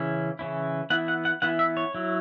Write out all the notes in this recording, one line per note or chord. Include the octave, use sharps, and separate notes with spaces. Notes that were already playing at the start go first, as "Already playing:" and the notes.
Already playing: C#3 E3 C#4 E4
C#3 E3 C#4 E4
E3 B3 E4 F#5
F#5
F#5
E3 B3 E4 F#5
E5
C#5
F#3 E4